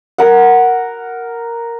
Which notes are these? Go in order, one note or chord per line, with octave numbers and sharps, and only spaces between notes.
A#4 F#5